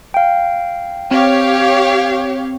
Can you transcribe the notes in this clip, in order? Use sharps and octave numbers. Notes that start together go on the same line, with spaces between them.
F5 G5
C4 G4 C#5 F5